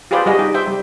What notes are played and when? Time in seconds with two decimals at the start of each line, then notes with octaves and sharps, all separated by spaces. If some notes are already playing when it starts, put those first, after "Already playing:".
0.11 F4 G4 G#4 B4 C5 D5
0.26 G3 F#4 G#4 D#5
0.38 D#4 G4
0.54 C5 E5 G5
0.67 G3